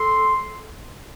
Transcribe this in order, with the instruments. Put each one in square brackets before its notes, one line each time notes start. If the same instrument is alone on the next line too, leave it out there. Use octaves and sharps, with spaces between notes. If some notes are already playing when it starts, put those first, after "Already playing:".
Already playing: [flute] A4 [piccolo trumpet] C6